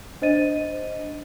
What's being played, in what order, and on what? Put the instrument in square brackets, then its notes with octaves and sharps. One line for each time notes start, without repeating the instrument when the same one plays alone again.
[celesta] D4 C5 D#5 A6 D#7